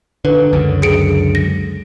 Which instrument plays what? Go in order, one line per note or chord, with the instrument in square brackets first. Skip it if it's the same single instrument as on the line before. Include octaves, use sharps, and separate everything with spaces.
[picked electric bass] D3 [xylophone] B4
[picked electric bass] C#2 F#2 D3
[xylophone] G#4 C#7 D7
A#6